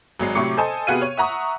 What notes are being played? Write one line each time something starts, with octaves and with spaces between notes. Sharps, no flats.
G#1 F#3 G#3 C7
A2 C3 F#3 C#6 D6 C#7
A4 C5 D#5 G#5 A5
C3 B3 F#4 G#4 F5 D#7
C#5
E5 F#5 A#5 C#6 D#6